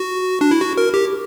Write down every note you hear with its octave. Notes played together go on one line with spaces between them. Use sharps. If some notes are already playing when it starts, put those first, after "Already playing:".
Already playing: F#4
D4
E4
F#4
A#4
G4